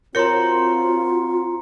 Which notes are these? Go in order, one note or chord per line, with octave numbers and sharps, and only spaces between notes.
C4 F4 F#4 A#4 C#5 A#5 C6 C#7